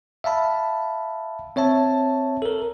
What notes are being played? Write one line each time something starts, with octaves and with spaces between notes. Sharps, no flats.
E5 F5 A5 B5
C4 C#5 E5 A5
A4 A#4